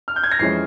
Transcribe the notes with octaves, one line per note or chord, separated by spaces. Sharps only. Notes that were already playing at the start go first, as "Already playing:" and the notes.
F6
G6
G#6
A#6
F2 E3 G#3 C#4 C7